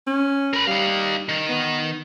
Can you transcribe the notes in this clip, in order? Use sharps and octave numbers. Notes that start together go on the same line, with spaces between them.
C#4
A#4 B5
G3 D#4 F5
D#3
B3